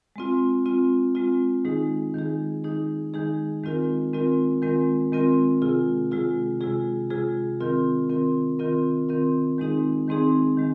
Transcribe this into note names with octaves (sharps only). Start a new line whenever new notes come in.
G#3 C4 F4
G#3 C4 F4
G#3 C4 F4
D#3 G#3 D#4 G#4
D#3 G#3 D#4 G#4
D#3 G#3 D#4 G#4
D#3 G#3 D#4 G#4
D#3 G#3 C4 F4 A#4
D#3 G#3 C4 F4 A#4
D#3 G#3 C4 F4 A#4
D#3 G#3 C4 F4 A#4
C3 G#3 F4 G#4
C3 G#3 F4 G#4
C3 G#3 F4 G#4
C3 G#3 F4 G#4
D#3 C4 F4 A#4
D#3 C4 F4 A#4
D#3 C4 F4 A#4
D#3 C4 F4 A#4
D#3 G#3 C4 D#4 G#4
D#3 G#3 C4 D#4 G#4
D#3 G#3